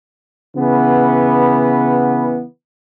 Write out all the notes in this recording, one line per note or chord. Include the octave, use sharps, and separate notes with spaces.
C#3 E3 B3